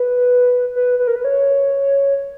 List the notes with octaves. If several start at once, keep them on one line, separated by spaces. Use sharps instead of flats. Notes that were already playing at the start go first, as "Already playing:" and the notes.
Already playing: B4
B4
B4
A#4
B4
C#5